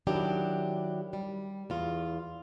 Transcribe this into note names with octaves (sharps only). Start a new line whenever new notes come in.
D#3 F#3 D4 E4 G4
G3
E2 F4